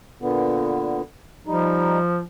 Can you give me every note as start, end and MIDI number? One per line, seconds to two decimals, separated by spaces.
0.22 1.01 46
0.22 1.01 50
0.22 1.01 59
1.47 2.23 53
1.47 1.98 55
1.47 1.98 63